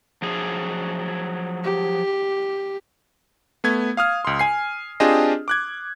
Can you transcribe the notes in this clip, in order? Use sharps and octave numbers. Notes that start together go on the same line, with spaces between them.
F3 F#3 G#4
G4
A3 B3 G#6
F5 D#6 F6
C#2 C6
G#5 C7
C4 D4 F4 G4 G#4 D#5
D6 F#6 G#6